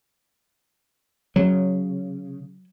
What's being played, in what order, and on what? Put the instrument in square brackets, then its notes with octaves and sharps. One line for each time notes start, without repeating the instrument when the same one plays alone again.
[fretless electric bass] C#3 [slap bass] F#3